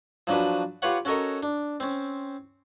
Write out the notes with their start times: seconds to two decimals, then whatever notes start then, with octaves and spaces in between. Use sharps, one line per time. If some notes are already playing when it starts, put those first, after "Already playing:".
0.27 F3 F#3 D4 F#4 B4
0.82 F4 G4 B4 C#5 F#5
1.05 C#4 F#4 A4 A#4 C#5 D#5
1.43 D4
1.80 C4 C#4